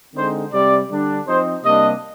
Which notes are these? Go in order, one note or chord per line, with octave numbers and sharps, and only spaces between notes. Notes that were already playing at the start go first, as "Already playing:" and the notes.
D3 G#3 C4 D#4 C5
C3 G3 C4 D5
D3 G3 D4
F3 C4 D#4 C5
C3 G3 A#3 D4 D#5